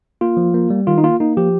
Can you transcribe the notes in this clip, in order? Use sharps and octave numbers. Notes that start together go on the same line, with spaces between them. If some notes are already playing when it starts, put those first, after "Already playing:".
A#3 F4
F3
A#3
G3
D#3 F4
D#4
A#3 F4
A#3 D#4
F3 G4